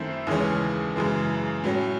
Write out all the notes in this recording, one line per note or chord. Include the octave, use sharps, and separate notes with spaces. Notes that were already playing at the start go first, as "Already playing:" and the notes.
Already playing: F#2 D#3 A3 C4 E4
D#2 C#3 E3 G#3 C#4
F#2 C#3 E3 G#3
A2 F#3 C#4